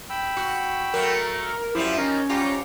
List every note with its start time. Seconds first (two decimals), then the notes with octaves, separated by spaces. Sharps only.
0.10 G5 B5 E6
0.37 F#4
0.94 F#3 A3 A#4
1.75 F#2 F3 G3 E4 C5 D6
1.98 C#4 D#4 A#4 A#5
2.29 G#2 G3 F4 G4 A#5